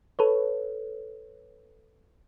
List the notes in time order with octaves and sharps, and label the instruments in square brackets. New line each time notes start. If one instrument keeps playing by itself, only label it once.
[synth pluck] A4 B4 C#5